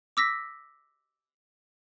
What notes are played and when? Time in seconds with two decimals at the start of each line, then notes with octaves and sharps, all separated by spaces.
0.17 D6 E6 A#6 B6